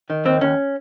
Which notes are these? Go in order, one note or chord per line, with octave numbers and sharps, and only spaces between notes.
D#3
D#2 C4
D#2 C#4